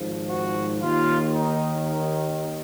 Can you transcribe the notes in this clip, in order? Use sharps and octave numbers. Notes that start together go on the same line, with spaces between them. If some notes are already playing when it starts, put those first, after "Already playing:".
Already playing: G#1 G#2 F3
F#4
D#2 D#3 F4
D#4
D#4